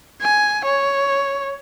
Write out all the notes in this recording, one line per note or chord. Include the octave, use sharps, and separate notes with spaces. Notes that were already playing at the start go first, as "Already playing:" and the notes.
G#5
C#5